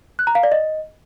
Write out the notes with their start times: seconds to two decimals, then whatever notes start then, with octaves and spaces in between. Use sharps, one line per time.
0.19 F#6
0.27 A#5
0.35 F5
0.43 D5
0.52 D#5